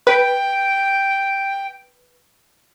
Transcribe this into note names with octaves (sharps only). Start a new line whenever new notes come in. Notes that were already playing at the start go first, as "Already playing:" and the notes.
B4 G5